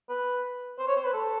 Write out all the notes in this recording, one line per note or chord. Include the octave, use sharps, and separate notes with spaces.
B4
C5
C#5
C5
B4
A4